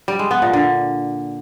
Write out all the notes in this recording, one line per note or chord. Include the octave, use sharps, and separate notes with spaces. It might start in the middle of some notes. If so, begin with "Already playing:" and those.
G3
G#3
B3
A#2
D3